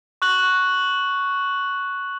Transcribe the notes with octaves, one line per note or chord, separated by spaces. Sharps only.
C#6 F#6 F#7